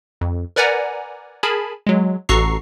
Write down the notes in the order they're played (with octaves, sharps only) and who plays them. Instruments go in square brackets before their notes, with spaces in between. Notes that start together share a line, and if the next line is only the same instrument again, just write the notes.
[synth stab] F2
A#4 B4 D5 F#5 G#5 A#5
G#4 A#4 G#5 A5 B5
F#3 G#3
A1 F#4 A4 A#5 C#6 C7